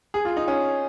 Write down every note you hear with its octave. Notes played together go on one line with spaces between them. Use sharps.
G#4
F4
D#4
C#4